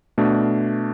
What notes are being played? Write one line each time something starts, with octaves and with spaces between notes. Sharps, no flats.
B2 A3 D4